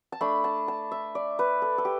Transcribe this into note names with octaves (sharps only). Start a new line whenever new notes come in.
A5
A3 D4 B5
A5
A5
E5
D5
B4
A4
A4
G4